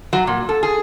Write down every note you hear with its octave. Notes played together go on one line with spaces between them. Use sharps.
F#3
A#2
A4
G#4